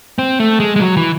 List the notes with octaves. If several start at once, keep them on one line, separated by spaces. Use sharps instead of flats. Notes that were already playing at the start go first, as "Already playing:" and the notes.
C4
A3
G#3
G#3
F#3
E3